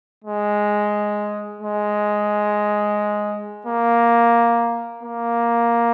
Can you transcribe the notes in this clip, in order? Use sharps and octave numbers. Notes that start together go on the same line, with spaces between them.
G#3
G#3
A#3
A#3